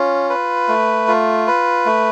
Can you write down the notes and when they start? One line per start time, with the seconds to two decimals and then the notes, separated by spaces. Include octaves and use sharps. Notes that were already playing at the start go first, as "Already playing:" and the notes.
Already playing: C#4 F4
0.30 B4
0.68 A3
1.08 F4
1.47 B4
1.86 A3